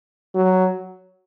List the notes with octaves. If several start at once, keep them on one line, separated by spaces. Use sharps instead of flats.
F#3